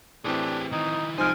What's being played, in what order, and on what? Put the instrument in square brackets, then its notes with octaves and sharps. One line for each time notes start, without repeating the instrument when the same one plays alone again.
[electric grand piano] A2 E3 C4 [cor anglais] D4 [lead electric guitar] G4 G#4
[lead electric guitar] D#3 E4 [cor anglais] D#4
[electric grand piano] C2 F3 C5 [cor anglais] G#3 [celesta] D#4 F6 D7 [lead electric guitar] G#5